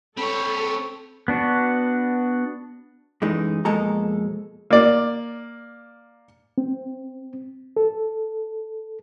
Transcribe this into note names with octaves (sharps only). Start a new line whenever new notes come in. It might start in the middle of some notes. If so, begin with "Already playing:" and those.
C4 A4 C#5 B5
B3 D4 F#4
F#2 E3 G#3 A3 D#4
F2 B2 G#3 A#3 A4 A#5
A#3 D5
C4
A4